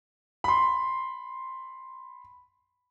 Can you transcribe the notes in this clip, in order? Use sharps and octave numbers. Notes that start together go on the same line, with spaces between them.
B5 C6